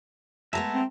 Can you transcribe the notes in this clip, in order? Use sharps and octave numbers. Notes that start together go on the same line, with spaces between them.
G#3 A3 B3 E5 A5 A#5
C4